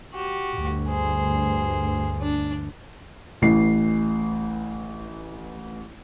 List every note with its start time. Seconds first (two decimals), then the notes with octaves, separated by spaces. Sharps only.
0.14 F#4 G4
0.56 D2 G2
0.89 G#4 C5
2.22 D4
3.42 A1 E3 C7